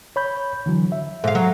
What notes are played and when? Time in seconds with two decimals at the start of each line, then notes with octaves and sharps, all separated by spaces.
0.16 C#5 B5 G6
0.66 D3 E3 F#3
0.92 E5
1.24 G#2 A4 E5 F5
1.35 F#3